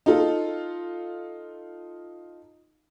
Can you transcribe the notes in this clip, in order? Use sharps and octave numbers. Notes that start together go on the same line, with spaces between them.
D#4 F4 A4